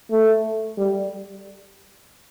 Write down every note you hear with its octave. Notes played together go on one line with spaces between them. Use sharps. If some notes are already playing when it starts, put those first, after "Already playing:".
A3
G3